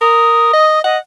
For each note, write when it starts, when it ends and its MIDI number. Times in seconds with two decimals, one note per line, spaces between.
0.01 0.52 70
0.01 0.79 87
0.53 0.80 75
0.84 0.98 75
0.84 0.98 78